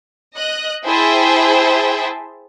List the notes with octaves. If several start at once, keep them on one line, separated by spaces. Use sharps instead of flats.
D#5 F#6
E4 G#4 C5 E5 G5 A5